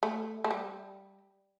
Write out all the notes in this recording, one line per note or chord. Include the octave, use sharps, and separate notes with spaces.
A3
A3
G3